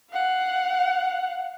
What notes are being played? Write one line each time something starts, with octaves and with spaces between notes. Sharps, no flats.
F5 F#5